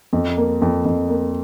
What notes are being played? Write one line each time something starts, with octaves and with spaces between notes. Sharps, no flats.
F2
A#3
F2
F2
A#3